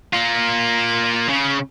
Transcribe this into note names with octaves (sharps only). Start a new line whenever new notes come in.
A#3 F4
C#3